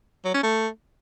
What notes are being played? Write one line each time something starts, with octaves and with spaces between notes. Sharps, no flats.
F#3
C#4
A3